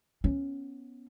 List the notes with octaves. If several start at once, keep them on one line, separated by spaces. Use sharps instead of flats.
B3 C#4